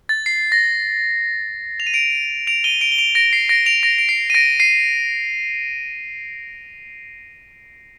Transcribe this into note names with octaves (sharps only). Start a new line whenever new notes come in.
A6
C7
A#6
F7
D#7
D7 F7
D7 F7
D#7 G7
D7 F7
G7
D7 F7
A#6 D7
C7
A#6 D7
D7 F7
A#6 D7
D7
C7
D#7
A#6 D7
C7 D#7